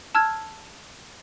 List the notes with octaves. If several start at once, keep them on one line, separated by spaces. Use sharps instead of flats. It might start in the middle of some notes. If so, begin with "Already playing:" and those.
A5 E6 F6 G#6